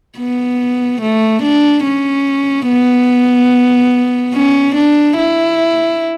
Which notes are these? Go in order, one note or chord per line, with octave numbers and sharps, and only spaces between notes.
B3
A3
D4
C#4
B3
C#4
D4
E4